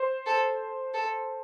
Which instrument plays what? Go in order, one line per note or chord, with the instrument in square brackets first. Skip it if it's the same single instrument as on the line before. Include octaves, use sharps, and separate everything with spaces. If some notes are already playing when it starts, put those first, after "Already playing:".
Already playing: [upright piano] C5
[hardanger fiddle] A4
A4